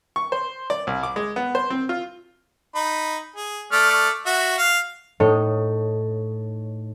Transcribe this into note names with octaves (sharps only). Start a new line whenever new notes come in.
C#6
C5
D5
C2
D6
G#3
B3
C5
C4
F4
D#4 B5
G#4
A3 D5 F6
F#4 E5
F5
A2 D#4 C#5